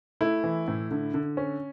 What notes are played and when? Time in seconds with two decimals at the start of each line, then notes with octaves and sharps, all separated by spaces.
0.21 A3 E4
0.44 E3
0.68 A2
0.91 D3
1.14 D3
1.37 C#4